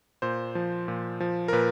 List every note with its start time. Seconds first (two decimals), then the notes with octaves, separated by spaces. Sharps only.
0.22 A#2 C5
0.55 F3
0.88 A#2
1.20 F3
1.48 A#4
1.53 A#2 B4